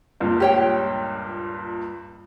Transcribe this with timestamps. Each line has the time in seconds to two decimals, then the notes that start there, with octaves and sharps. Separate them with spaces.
0.20 C#2 G2 A#2
0.40 G4 C#5 G5